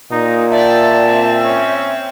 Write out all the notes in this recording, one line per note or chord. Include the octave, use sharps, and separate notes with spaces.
A#2 D#4
D5 E5 G5 A5
C4 G5
C#4